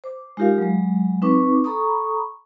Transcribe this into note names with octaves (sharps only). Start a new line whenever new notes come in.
C5 D6
G#3 D#4 F4 G4 A#4 F5
F#3 G#3
C4 D#4 B4 C#6 D6
A4 A#5 B5 C#6 D#6